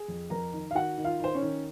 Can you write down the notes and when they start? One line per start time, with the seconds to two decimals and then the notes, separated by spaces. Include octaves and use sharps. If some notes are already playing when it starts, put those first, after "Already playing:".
Already playing: G#4 G#5
0.08 F2
0.30 F2 A#4 A#5
0.53 D#3
0.71 F5
0.75 D#3 F#4 F#5
0.98 D#3
1.04 F4 F5
1.20 D#3 C5
1.35 C#4 C#5
1.42 D#3